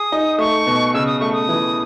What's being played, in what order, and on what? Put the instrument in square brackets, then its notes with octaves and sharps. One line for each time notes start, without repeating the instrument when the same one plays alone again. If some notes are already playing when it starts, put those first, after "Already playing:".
Already playing: [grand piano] G#4 [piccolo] D#6
[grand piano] D#4
[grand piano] A3 [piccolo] C#6
[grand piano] B2
[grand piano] C#3 [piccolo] E6
[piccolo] D#6
[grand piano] A3 [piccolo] C#6
[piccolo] D#6
[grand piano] E3